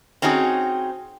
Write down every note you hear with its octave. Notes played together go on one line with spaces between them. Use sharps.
C4 C#4 D#4 F#4 G#4